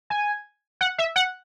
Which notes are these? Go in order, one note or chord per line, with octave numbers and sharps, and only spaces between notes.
G#5
F#5
E5
F#5